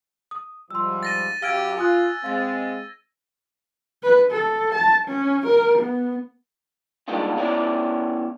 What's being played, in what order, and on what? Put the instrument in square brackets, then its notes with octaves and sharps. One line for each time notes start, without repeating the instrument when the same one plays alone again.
[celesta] D#6
[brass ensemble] G#2 F3 G3 [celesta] C6 E6
[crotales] A6 A#6 D#7
[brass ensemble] F#2 G4 [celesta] F5 F6 D7 [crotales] E6 G#6
[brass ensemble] F4 [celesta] G#5 D#6 F#6
[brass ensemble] G#3 C4 [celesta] F5 A6
[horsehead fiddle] B4
A4
A5
C#4
A#4
B3
[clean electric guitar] G3 G#3 A#3 D4 D#4 F4
B3 C#4 E4 C#5 D5